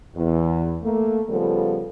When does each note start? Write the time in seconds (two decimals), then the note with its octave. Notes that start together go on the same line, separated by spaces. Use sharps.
0.15 E2
0.82 A3 A#3
1.29 C#3 F3 G3 B3 A4